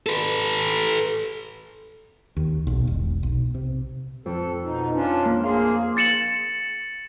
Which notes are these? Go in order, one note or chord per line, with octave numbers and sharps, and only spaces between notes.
A4 B4
D#2
B1
E1
B1
C3
F2 A4
B2 D#4
C#4 D4 F4
A#3
A#3 G#4 F5 C6
A6 C#7 E7 F#7